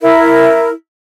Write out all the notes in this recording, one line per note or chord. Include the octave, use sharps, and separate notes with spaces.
E4 A#4